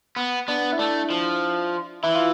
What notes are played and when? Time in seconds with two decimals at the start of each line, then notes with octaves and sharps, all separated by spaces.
0.16 B3
0.48 B3 D4
0.73 E4
0.79 A3 D4
1.10 F3
2.03 E3 E4
2.15 F4